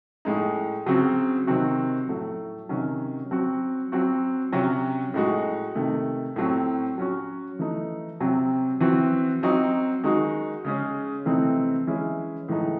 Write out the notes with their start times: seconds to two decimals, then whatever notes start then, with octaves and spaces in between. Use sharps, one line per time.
0.25 A2 G#3 D#4
0.86 C#3 F#3 C4 F#4
1.47 C3 D#3 F#3 C4 F#4
2.08 A2 F#3 A3
2.69 C3 D#3 F#3 C#4
3.31 F#3 C4 F#4
3.92 F#3 C4 F#4
4.52 C3 F#3 C#4 F#4
5.14 A2 G#3 D#4 F#4
5.75 C3 D#3 A3
6.36 A2 F#3 C4 F#4
6.98 F#3 C#4 F#4
7.59 E3 A3 D#4
8.20 C3 F#3 C4
8.80 E3 C4 F#4
9.43 F#3 C4 D#4 F#4
10.04 D#3 G#3 D#4 F#4
10.65 C#3 G#3 C#4
11.26 C3 E3 A3 C4 D#4
11.87 E3 G#3 C#4 E4
12.48 A2 E3 G#3 D#4